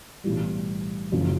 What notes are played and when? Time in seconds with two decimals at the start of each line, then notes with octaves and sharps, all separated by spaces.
0.24 B1 A2 E3 G3
1.12 F#1 F#2 C#3 F3